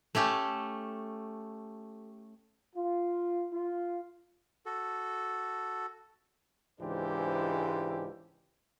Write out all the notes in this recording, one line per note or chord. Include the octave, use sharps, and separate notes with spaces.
A3 C#4 G4 A4
F4
F4
F#4 A4
C#2 G#2 E3 D4 G4 C5